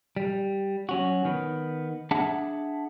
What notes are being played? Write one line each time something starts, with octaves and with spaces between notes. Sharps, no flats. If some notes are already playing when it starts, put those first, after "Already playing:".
G3
F#3 C#4 F#4
D#3 B3
D4 G#4 E5 F#5 A5